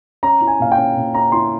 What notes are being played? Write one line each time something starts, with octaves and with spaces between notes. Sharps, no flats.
C#4 A#5
E4
G#5
A#2 F5
G5
C#4
A#2
C#4 A#5
E4 C6